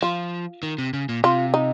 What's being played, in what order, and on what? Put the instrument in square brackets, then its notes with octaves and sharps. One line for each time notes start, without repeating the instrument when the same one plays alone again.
[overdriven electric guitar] F3 [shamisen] F4
[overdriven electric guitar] D#3
C3
C#3
A#2
[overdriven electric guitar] C3 [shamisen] F4
[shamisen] D#4